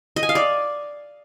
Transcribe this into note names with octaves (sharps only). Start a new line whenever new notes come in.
D#5
G#5
F5
D5